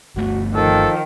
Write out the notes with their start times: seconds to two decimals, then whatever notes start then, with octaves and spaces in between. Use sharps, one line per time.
0.16 G1 A3 F#4
0.55 D#3 F3 A4